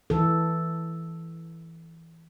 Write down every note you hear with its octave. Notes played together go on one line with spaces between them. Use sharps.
E3 A4